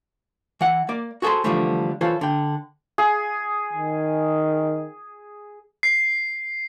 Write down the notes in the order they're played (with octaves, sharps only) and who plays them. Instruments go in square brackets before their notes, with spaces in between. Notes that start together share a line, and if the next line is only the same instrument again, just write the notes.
[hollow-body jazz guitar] E3 F#5
A#3 D5
F#4 G#4 A4 C5 C6
D3 E3 F3 G3 A3
E3 F4 A4 C5 C#5
D3 G5
[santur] G#4
[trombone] D#3
[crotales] C7